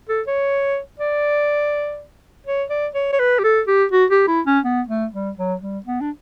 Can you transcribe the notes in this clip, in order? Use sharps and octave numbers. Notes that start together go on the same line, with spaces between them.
A4
C#5
D5
C#5
D5
C#5
C#5
B4
G4
A4
G4
F#4
G4
E4
C#4
B3
A3
G3
F#3
G3
B3
D4